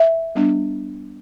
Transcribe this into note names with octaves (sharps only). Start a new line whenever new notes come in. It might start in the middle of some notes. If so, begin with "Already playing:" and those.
Already playing: E5
G3 B3 D4